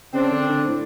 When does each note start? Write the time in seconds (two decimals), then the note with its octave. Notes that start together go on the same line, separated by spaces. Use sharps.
0.14 C#3 C4 D4
0.31 D3
0.49 D3
0.68 A2